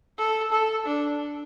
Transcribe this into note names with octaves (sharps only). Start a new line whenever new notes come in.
A4
A4
D4